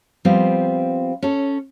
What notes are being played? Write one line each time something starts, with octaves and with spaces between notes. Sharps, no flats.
F3 G3 B3 C4 F4
C#4 A4